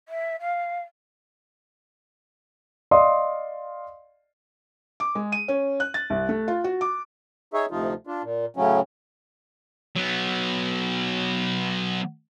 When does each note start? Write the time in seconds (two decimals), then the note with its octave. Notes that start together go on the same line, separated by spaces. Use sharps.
0.08 E5
0.40 F5
2.91 D5 D#5 F5 C6 D#6
5.00 D6
5.15 G#3
5.32 D#7
5.48 C#4
5.80 F#6
5.94 A6
6.10 C2
6.29 A3
6.48 F4
6.64 F#4
6.81 D6
7.54 D#4 G#4 C#5 E5
7.71 D2 C3 F3 D#4 F4
8.07 D4 F4
8.23 A#2
8.56 A2 C#3 F#3 C#4
9.96 F#3 B3